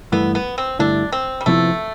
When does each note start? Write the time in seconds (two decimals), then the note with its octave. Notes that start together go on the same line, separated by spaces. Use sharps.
0.12 G2 E3 A3 B3
0.35 B3
0.58 C4
0.79 G2 D3 A3 D4 E4
1.12 C4
1.41 G3
1.46 C3 F3 A3 B3 E4